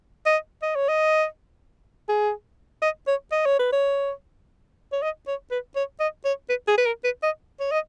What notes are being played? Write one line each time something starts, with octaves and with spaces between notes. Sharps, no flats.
D#5
D#5
C#5
D#5
G#4
D#5
C#5
D#5
C#5
B4
C#5
C#5
D#5
C#5
B4
C#5
D#5
C#5
B4
G#4
B4
A#4
B4
D#5
C#5
D#5